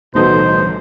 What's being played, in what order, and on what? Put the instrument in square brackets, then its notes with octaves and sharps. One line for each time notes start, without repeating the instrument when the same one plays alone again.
[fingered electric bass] D1 E3 G3 [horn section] B2 [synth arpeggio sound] A3 D#4 A4 [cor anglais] C5